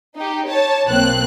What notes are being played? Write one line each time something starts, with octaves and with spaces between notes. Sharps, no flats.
D#4 G4
C#5 A5
B1 A#3 C4 F#6